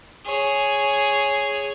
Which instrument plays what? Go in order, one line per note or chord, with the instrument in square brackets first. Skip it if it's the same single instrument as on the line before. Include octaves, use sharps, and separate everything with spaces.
[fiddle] G#4 C#5